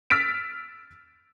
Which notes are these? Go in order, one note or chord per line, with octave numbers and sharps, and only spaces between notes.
E6 F6 A6 B6 D7